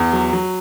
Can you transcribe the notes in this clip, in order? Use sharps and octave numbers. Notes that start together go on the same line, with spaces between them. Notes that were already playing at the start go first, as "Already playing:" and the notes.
Already playing: E2
F#3
F#3